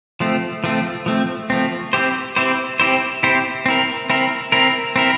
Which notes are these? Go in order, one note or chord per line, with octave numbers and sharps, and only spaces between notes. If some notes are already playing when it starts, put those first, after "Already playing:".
F3 A3 C4
F3 A3 C4
F3 A3 C4
F3 A3 C4
C4 E4 G4 C5
C4 E4 G4 C5
C4 E4 G4 C5
C4 E4 G4 C5
C4 E4 A#4
C4 E4 A#4
C4 E4 A#4
C4 E4 A#4